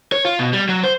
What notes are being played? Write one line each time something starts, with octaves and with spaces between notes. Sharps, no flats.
C#5
F4
B2
G3
F#3
C5